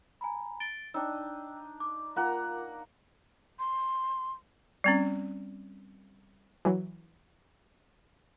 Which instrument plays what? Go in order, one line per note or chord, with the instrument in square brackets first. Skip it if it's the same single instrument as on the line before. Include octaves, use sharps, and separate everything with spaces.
[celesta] G#5 A#5 B5
A6 D7 G7
[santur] D4 D#4 [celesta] G5 E6
[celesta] D6
[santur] A#3 F#5 A#5 [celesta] F4 A#4
[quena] C6
[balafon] G3 C4 C#4
[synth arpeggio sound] E3 F#3